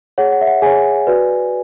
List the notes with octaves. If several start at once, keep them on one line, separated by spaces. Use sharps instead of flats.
G#4 C#5 F#5
F#5
E5
F#5
G#4 C#5 G#5
F#4 B4 D5